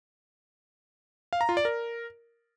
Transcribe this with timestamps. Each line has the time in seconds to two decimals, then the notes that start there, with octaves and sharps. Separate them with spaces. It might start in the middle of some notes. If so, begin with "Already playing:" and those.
1.33 F5
1.41 A#5
1.49 F4
1.57 D5
1.65 A#4